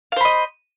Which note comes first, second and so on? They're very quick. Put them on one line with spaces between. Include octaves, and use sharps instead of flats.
F5 C5 B5 D#5